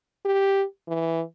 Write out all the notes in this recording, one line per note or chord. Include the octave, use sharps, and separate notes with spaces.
G4
E3